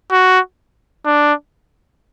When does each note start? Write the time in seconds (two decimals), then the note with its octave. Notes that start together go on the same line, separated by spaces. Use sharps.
0.12 F#4
1.05 D4